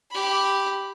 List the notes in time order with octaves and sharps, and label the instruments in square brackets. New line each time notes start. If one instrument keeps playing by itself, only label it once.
[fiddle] G4 B5